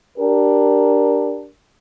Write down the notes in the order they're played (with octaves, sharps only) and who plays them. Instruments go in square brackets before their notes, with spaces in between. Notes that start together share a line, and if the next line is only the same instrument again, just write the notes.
[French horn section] D4 G4 A#4